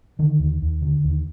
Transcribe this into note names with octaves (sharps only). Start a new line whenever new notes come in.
D3 D#3
D#2
D#2
D3
D#2